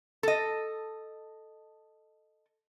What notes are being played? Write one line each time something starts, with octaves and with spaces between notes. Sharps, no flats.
A4 D#5